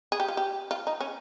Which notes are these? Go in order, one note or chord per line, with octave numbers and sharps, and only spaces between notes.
G#4
G4
F4
G4
F4
D#4
C#4